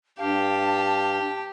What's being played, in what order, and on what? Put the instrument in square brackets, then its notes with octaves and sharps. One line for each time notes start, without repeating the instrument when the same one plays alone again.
[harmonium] G2 F5 [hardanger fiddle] G4 [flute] A5